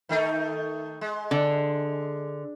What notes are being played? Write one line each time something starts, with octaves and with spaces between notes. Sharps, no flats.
D#3 A3 D#4
G#3
D3